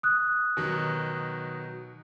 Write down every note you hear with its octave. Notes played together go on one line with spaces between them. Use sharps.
D#6 F#6
B2 D#3 F#3